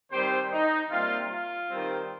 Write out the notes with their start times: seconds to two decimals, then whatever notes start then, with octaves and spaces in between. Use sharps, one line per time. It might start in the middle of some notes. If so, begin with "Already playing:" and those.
0.11 D#3 G3 C4 G4 C5
0.52 D#4
0.90 C3 G3 A#3 F4
1.30 F4
1.70 D#3 G3 C4